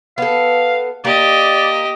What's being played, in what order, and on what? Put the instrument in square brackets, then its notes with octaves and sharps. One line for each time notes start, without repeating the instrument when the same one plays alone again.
[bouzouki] B3 A4 [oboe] F5
[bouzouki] A#3 [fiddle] G4 D#5 [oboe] D5